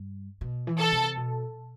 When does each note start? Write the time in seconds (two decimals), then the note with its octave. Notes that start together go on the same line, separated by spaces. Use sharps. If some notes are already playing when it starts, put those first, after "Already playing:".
Already playing: G2
0.41 B2
0.67 E3
0.79 A4
0.92 C3
1.17 B2